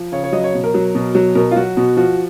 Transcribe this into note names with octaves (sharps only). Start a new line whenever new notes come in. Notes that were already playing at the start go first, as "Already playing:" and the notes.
Already playing: F3
C#3 C#5
C#5
F#3 D#5
C#5
B2
A#4
F#3
B2
F#3
B2 A#4
F4
F#3 F#4
B2
F3 F#4